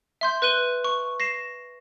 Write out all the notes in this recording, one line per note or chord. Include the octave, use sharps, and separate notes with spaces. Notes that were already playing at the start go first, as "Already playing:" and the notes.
E5 C6 G6
B4 F#6 D#7 G7
C#6
A#6 C7 E7